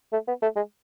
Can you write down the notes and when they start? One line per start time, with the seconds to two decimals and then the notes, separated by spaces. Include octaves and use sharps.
0.13 A3
0.28 B3
0.42 A3
0.56 G#3